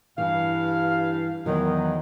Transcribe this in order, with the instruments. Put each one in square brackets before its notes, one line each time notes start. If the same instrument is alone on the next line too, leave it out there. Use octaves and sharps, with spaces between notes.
[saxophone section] G2 F5 [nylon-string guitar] E3
[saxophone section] E2 D#3 [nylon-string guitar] F#3